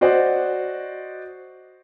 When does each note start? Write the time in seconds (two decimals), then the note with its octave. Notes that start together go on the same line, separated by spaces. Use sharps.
0.01 F#4 C5 D5 D#5 F#5